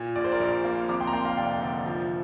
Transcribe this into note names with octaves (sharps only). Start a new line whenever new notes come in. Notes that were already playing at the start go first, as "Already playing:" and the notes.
Already playing: A#2
A#1 D5
C5
A#4 D5
A#1
A#3
F2 A#5 D6
G5 C6
A#5
A#3 G5 C6
F5 A#5
F1 D5 G5
D3
F3